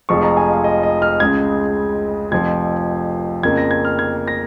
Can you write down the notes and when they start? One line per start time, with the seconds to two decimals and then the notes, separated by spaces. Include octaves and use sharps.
0.09 F1 F2 F3 G#3 C#6
0.23 A#5
0.37 G#5
0.50 F5
0.64 D#5
0.83 D#5
1.02 F6
1.20 C#2 C#3 G#3 G#6
2.31 F1 F2 F3 G#6
3.43 F2 C#3 A#3 G#6
3.57 A#6
3.71 G#6
3.85 F6
3.99 G#6
4.28 A#6